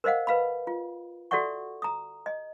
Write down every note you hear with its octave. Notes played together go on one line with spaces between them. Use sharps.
A#4 C5 D#5 F5 F#5
B4 F5 B5
F4
F#4 A4 D5 E5 F#5 C#6
A#5 D#6
D#5